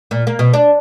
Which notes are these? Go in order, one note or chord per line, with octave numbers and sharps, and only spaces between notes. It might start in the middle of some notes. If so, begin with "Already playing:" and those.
A#2
A#3
B2
D4